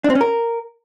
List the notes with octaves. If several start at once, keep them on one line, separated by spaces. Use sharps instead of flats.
D4
C4
C#4
A#4